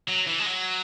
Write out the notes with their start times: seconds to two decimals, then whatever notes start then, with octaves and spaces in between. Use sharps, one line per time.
0.08 F#3
0.27 E3
0.40 G#3
0.46 F#3